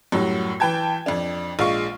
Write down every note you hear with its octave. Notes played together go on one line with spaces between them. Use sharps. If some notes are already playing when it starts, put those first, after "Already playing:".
F#2 A2 F#3 G3
E3 B4 G5 A5 G#6
F2 D4
A#1 G#3 F4 F5 C#6